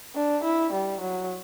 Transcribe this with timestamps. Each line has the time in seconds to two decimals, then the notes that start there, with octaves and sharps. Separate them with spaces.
0.15 D4
0.44 E4
0.73 G3
1.01 F#3